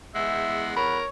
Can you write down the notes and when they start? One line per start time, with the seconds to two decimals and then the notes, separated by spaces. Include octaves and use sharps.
0.15 E2 G#3 E5 F#5
0.77 A#4 C#5 B5